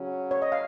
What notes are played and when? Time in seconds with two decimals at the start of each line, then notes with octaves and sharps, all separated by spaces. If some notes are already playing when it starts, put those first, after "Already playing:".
Already playing: C#3 F#3 C#4 F#4
0.31 C#5
0.42 D#5
0.52 F5